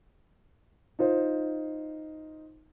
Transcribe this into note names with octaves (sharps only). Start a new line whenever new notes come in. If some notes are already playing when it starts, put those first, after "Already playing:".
D#4 F4 C5